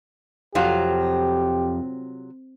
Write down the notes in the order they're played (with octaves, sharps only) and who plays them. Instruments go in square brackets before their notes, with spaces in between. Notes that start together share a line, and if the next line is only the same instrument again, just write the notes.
[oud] F2 [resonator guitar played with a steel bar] C3 F#3 F4 [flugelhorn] G4